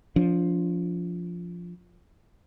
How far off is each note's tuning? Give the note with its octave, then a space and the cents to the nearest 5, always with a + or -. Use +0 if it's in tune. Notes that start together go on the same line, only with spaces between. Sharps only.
F3 +0 D4 -35